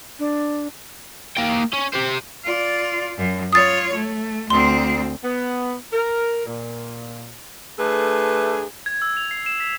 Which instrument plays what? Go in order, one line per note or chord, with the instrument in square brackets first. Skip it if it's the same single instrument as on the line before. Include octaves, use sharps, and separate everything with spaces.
[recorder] D4
[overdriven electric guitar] A#3 G5
C#4
G4 C5
[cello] F4 D5
F#2
[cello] F4 C#5 [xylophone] D#6 A6
[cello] A3
[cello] D2 C4 [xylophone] C6
[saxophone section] B3
A#4
A#2
A3 D4 G#4 A4 B4
[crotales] G#6
E6
F7
C7
E7
B6